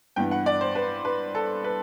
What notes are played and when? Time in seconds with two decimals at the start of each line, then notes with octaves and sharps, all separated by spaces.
0.16 G2 E3 B3 G5
0.31 F#5
0.46 D5
0.61 C5
0.75 B4
1.05 B4
1.35 A4
1.64 B4